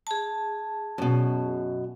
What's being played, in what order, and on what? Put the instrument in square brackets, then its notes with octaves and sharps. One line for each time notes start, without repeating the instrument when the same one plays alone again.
[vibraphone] G#4 A5
[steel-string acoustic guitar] F#2 B2